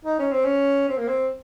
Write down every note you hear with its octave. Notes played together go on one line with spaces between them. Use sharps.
D#4
C#4
C4
C#4
C4
A#3
C4